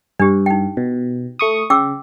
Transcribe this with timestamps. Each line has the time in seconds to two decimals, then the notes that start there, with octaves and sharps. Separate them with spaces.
0.20 G2 D4 G4
0.46 D#4 G5
0.77 B2
1.39 A3 C#6 D#6
1.70 C#3 G5 D6 E6